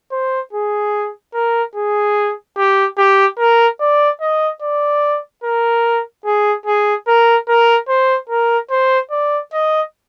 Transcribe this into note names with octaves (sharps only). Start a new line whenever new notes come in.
C5
G#4
A#4
G#4
G4
G4
A#4
D5
D#5
D5
A#4
G#4
G#4
A#4
A#4
C5
A#4
C5
D5
D#5